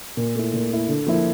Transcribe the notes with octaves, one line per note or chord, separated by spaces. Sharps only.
A#2
A3 E4
A#2
A3 E4
D3
F3 A#3 E4